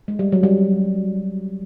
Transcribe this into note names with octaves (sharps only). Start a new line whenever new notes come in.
G#3
G3
F#3
G3